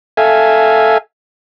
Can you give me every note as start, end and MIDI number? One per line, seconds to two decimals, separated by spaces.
0.17 0.98 69
0.17 0.98 76
0.17 0.98 77
0.17 0.98 80